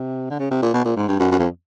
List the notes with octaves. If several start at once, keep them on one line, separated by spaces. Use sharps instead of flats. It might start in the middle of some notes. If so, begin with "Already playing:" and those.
Already playing: C3
D3
C#3
C3
A#2
B2
A#2
G#2
G2
F#2
F#2
F2